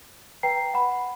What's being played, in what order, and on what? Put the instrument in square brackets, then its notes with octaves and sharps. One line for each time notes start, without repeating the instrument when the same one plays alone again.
[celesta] B4 G5 A#5 C7
F#5 B5